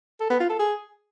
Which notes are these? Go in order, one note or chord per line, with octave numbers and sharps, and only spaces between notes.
A4
B3
F4
A4
G#4